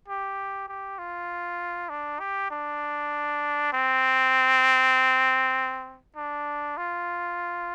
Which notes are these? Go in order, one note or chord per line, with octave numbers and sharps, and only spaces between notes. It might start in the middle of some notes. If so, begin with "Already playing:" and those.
G4
G4
F4
D4
G4
D4
C4
D4
F4